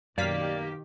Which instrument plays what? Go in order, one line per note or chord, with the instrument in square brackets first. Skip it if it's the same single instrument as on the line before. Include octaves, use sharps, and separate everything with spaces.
[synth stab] F#2 F5 B6 [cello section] B2 D#3 G4 [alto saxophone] A#3 [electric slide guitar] D5